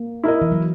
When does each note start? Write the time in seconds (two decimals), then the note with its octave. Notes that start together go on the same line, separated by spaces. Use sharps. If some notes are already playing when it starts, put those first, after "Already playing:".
Already playing: A#3
0.24 E4 A#4 D#5
0.42 E3
0.52 F#3